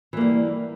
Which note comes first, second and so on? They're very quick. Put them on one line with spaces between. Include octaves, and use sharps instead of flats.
E3 A#3 G3